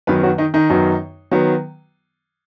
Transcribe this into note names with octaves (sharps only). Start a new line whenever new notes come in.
F#2 D#3 F#3 B3 B4
F#3 F#4
D#3 D#4
D#3 D#4
F#2 D#3 F#3 B3
D#3 F#3 B3